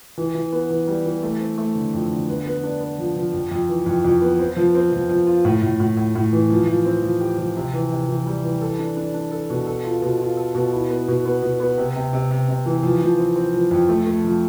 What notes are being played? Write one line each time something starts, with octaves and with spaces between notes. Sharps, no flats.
E3
E3
B3
E3
G3
E3
A3
C4
A3
D3
F2
D3
B3
B3
D4
B3
F3
F3
F2
F2
E3
F2
F2
B3
C4
F3
C4
F3
F3
F4
A2
A2
A2
A2
A2
E3
F3
F3
C4
F3
G4
F3
C3
E3
C3
E3
G3
E3
A4
D4
D4
D4
A4
B2
A4
F4
B2
F4
A4
B2
E4
B3
B2
B3
B2
B3
C3
C3
C3
C3
C3
E3
F3
F3
C4
C4
F3
F2
A3
A3
F3